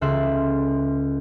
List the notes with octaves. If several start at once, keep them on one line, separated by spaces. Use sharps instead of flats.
C#2 A4 E5 C6 F#6 E7